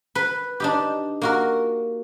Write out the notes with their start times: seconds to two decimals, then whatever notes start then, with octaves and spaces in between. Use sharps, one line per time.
0.15 B4
0.60 D4 D#4 G4
1.22 A#3 F#4 A#4